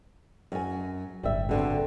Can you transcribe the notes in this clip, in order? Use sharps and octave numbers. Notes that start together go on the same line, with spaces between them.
F#2 G#5
D1 G1 G3 E5
B2 D3 C4